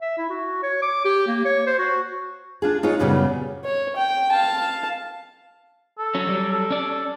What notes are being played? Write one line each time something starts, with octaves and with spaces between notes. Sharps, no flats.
E5
E4
F#4
C#5
D6
G4
A#3
C#5
C5
F#4
D4 F4 G#4
D#4 F4 G#4 C#5
F#2 A#2 C#3 F#3 G3 B3
C#5
G5
F5 A5
A4
F#3 C#4
F#3 G3
A4
C#4 D5